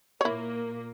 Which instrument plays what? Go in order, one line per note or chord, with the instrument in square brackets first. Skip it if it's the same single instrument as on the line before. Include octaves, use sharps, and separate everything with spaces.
[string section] A#2 A#3 [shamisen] E4 C#5